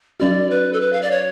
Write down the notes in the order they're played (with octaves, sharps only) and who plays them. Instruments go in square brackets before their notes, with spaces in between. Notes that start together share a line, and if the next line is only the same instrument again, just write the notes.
[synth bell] F#3 C#4 F#4 [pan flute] D5
[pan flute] B4
A4
B4
F5
D5
C#5